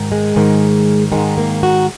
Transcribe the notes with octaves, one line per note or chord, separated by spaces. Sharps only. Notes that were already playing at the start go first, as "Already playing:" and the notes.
Already playing: G#2 D#3
G#3
G#2 D#3
G#2 D#3 G#3
A#3
F#4